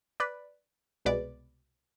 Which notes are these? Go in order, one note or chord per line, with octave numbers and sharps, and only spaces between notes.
B4 D5
C2 B2 G#3 B4 D5